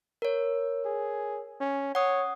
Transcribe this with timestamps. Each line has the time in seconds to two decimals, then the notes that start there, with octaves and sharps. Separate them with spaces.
0.22 A#4 C#5
0.85 G#4
1.60 C#4
1.95 C#5 F#5 D#6